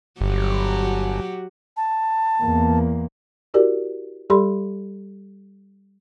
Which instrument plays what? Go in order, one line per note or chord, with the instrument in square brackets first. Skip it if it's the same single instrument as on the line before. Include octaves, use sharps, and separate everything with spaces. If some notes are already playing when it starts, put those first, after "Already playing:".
[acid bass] G1 [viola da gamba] F#3 F#4 G4
[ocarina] A5
[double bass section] E2 A#3
[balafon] E4 F#4 G4 A#4 D5
G3 G4 A4 D5 B5 C6